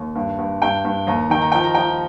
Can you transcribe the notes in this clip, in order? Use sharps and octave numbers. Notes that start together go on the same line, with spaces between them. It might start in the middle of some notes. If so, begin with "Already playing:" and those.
Already playing: D#2
G2
G2
G2 G5
G2
D#2 A#5
D#3 G5
A#5
F3 G5
A#5
F3 G5